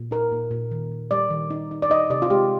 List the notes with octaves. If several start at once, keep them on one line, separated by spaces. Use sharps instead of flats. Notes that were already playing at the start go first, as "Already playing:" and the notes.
Already playing: A#2
D#4 A#4
A#2
A#2
D#3
D#3
G3 D5
D#3
D#4
D#4
D5
D#4 D#5
C3 D5
F4
G#3 G4